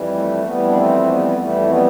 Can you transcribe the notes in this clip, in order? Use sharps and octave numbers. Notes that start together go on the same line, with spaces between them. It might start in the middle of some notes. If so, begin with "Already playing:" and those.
Already playing: F2 E3 G3
A3
F2 E3 G3 B3
D4
A3 C4
G3 B3
F2 E3 G3 A3
G3 B3